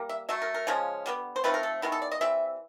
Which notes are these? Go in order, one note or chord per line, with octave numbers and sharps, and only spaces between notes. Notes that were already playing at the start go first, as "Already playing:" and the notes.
Already playing: G3 A#3
E5
F#3 A3 E5
A#4
A#4
C#3 F3 G#3 C#4
D3 G3 B3
C5
F3 A3 C4 D#4 B4
A#4
A4
D#3 G#3 B3 E4 A#4
A4
D5
D#5
E3 G3 C4 E5